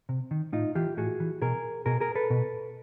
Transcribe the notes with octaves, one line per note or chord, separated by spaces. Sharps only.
C3
D#3
A2 D#4 F4
E3 F4 G4
A2 F#4 G#4
E3
B2 G#4 A#4
B2 G#4 A#4
G#4 A#4
A4 B4
B2